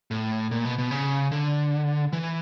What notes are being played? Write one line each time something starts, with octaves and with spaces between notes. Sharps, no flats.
A2
A#2
B2
B2
C#3
D3
E3